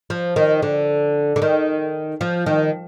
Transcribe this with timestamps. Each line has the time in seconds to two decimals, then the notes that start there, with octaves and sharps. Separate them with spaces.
0.10 F3
0.36 D#3
0.62 D3
1.36 D3
1.42 D#3
2.21 F3
2.46 D#3